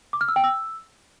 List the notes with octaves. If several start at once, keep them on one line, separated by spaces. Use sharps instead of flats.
D6
F6
E6
G5
E6